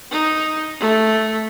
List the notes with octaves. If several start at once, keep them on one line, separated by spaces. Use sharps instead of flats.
D#4
A3